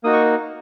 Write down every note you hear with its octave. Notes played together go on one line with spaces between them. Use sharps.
A#3 D#4 F#4 D#6
C#6